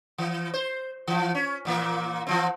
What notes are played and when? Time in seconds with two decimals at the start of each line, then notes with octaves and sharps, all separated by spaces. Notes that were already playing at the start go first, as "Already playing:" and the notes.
0.18 E3
0.54 C5
1.07 E3 F3
1.35 C#4
1.65 A#2 E3 A#3
2.27 E3 F3 C4